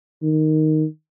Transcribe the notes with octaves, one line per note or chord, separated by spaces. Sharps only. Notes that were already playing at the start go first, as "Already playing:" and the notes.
D#3